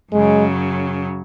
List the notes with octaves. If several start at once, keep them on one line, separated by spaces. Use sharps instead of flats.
F#2 C#3 F#3 G#3